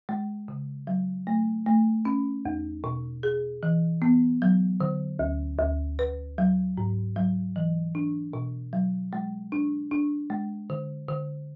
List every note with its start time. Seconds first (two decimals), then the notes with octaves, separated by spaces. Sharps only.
0.09 G#3
0.48 C#3
0.87 F#3
1.27 A3
1.66 A3
2.05 C#4
2.45 E2
2.84 B2
3.23 G#4
3.63 E3
4.02 B3
4.42 F#3
4.81 D3
5.19 D2
5.59 D2
5.99 B4
6.38 F#3
6.78 G#2
7.16 F#3
7.56 E3
7.95 D4
8.33 B2
8.73 F#3
9.13 G#3
9.52 D4
9.91 D4
10.30 G#3
10.70 D3
11.08 D3